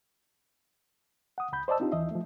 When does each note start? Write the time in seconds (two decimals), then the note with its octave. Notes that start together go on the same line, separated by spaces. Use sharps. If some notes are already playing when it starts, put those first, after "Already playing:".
1.38 F#5 D#6
1.52 C#2 B5 G6
1.68 C5 D5 D#5 A5 E6
1.80 C4 D4 D#4 F4 G4
1.92 D#2 E3 D#5 E5
2.11 F3 A3